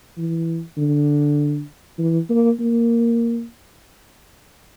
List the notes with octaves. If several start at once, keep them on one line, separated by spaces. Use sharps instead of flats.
E3
D3
E3
A#3
A#3